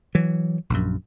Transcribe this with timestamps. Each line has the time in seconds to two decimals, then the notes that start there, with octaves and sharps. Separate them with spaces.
0.15 E3 F#3
0.70 A#1 F#2